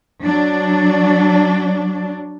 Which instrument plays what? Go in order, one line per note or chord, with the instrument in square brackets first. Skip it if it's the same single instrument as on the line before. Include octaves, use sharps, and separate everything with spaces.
[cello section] F#3 D4